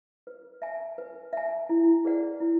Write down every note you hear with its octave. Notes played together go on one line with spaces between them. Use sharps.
B4
E5 G#5
B4
E5 G#5
E4
G#4 B4 D5 F#5
E4